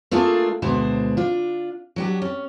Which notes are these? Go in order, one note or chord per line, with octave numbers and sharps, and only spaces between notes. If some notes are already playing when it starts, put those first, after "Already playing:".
A3 A#3 D4 F4 G#4 A4
D2 B2 G#3 D4 C5
D4 F4
F#3 D4 G4
C#4